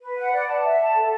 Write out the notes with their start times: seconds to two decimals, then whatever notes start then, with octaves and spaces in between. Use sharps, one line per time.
0.02 B4
0.17 F#5
0.32 D5
0.48 A5
0.64 E5
0.79 A5
0.95 A4